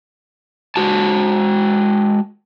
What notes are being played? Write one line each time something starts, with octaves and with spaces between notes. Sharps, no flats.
G#3 F#4 A5